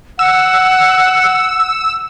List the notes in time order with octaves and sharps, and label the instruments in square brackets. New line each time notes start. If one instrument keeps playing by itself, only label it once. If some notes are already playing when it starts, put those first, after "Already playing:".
[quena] F#5 [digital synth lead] E6